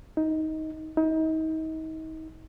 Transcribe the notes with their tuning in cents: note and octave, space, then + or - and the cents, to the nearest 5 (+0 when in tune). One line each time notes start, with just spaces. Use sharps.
D#4 +15
D#4 +35